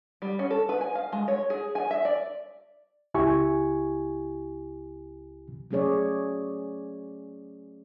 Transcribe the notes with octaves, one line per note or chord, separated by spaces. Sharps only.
G3
C#4
A4
B4
G#5
F5
G#3
C#5
G#4
G#5
E5
D5
C#2 E4 G4 G#5 C#6
F#3 A3 C#4 G#4 C#5 D5